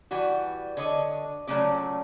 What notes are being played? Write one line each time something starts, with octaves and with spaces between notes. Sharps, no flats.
E3 G3 F#4
D3 C#5 D#5
A#2 C#3 F#3 A3 C#4 D5